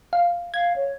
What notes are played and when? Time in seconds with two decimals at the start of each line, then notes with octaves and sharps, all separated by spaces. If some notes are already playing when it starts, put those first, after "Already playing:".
0.13 F5
0.54 F5 G#6
0.76 C#5